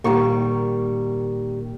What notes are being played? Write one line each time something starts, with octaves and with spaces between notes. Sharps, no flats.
A#2 D#3 G3 A#3 C#6